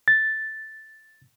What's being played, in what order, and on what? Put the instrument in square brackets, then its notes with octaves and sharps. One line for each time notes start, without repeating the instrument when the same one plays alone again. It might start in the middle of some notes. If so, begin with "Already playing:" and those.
[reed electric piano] A6